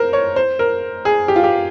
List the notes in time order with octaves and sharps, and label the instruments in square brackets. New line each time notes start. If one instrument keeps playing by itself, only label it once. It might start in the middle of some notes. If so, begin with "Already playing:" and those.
Already playing: [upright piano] A#4 C5
C#5
C5
A#4
G#4
G4
F4
G4